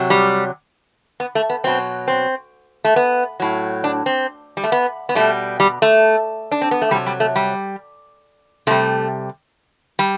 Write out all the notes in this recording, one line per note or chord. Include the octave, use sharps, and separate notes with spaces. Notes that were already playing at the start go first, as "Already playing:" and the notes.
Already playing: C3 F#3
G3
B3
A3
B3
B2 F#3 C4
C4
A3
B3
A2 F#3
D4
C4
G3
A3
B3
B3
B2 G3 A3
G3
A3
D4
C4
B3
A3
C3 F#3 G3
G3
A3
G3
C3 G3 A3
G3